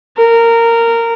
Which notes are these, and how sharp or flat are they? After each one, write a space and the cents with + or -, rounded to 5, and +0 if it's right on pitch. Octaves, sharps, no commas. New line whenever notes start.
A#4 -15